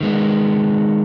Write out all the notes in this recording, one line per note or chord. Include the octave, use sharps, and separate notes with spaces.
D#3 G#3 B3